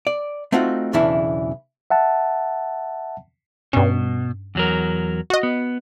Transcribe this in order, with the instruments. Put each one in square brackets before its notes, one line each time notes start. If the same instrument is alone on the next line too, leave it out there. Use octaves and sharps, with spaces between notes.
[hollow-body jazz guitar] D5
A3 C4 D#4 F4 F#4
B1 E2 C#3 E3 D4 E4
[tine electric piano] E5 F#5 A5
[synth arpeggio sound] G2 C#4 [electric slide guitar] B2
[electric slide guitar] E2 F#3 A#4
[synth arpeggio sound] F#4 D#5
[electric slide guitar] B3